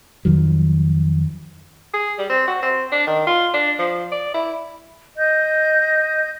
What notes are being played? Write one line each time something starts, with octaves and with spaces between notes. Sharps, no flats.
F2 D#3 F#3
G#4
G3
C4
F#4
C4
D4
D#3
F4
D4
F3
D5
E4
D#5 G6